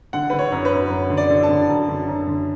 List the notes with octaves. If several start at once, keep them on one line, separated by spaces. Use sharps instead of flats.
D3 F#5
D3 B4
C#5
F#2
B4
F#2
F#2
D3
D5
D3
A5
D3
F#2
D3
F#2
D3